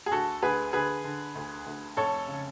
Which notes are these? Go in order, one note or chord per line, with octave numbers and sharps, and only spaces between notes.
G#4
D2 F#4 A4
D2 G#4 B4
D3 G#4 B4
D3
D2
D2
F1 A4 C#5
C#3